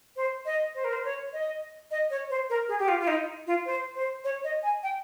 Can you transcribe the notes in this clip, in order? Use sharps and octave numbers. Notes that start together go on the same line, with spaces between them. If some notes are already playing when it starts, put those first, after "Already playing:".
C5
D#5
C5
A#4
C5
C#5
D#5
D#5
C#5
C5
A#4
G#4
G4
F4
F4
D#4
F4
C5
C5
C#5
D#5
G#5
G5